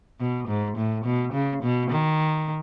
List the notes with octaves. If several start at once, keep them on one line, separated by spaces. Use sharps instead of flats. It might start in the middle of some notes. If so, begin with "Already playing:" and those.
B2
G#2
A2
B2
C#3
B2
D#3